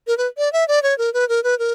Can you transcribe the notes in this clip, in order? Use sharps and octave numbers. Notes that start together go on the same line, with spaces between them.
A#4
B4
D5
E5
D5
C#5
A#4
B4
A#4
B4
A#4